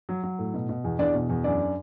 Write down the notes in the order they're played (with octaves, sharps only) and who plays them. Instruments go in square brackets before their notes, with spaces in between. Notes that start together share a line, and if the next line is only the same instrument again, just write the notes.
[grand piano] F#3
F#3
A2
B2
B2
E2
E2 D4 D5
B2
E2
F#2 D4 D5